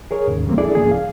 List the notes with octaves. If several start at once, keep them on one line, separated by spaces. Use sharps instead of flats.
G#4 A#4 C#5
D#2 G#2 C#3
D2 E3 G3 A3 A#3 C4
D4 E4 G#4 A4 D5
C2 G#2 C#3 F3 A#3 G#4
F5